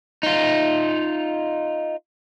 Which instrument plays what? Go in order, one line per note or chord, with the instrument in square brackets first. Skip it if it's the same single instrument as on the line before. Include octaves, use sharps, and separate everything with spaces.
[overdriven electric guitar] D#4 F4